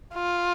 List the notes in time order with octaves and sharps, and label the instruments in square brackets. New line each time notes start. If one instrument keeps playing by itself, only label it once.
[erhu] F4